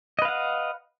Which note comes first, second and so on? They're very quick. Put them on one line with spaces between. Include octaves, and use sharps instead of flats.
D#5 B4 F5 F#5